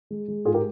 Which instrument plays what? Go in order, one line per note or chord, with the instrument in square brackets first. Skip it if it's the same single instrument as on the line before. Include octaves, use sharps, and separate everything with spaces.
[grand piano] G#3
G#3
G#2 F4 G#4
G4 A#4